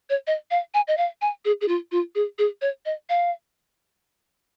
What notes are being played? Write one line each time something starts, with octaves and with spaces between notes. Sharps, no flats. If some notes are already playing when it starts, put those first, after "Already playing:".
C#5
D#5
F5
G#5
D#5
F5
G#5
G#4
G#4
F4
F4
G#4
G#4
C#5
D#5
F5